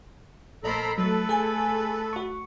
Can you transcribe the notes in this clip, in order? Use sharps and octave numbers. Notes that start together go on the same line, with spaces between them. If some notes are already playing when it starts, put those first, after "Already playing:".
A#1 A#3 A4 C5 D#5 A#5 B5
F#3 A3 A4 B4
G#4 G#5
F#4 C#6